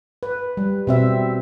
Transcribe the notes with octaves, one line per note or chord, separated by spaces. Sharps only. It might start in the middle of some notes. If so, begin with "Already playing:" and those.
B4
G3
B2 C4 E5